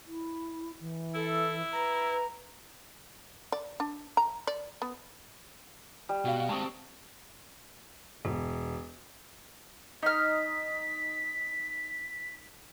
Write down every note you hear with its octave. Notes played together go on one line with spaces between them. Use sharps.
E4
E3
E4 A4
B4 A#5
D5
D4
A#5
D5
B3
G3
B2 F#4 F5
G#3 C4 A5 C#6 D#6
E1
D#4 F6 B6